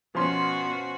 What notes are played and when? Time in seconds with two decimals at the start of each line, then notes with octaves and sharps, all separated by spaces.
0.15 B2 F3 C#4 F#4 C6